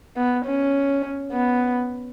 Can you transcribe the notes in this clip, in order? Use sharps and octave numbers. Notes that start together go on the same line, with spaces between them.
B3
C#4
B3